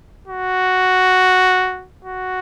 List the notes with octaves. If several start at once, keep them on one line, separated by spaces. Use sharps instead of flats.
F#4
F#4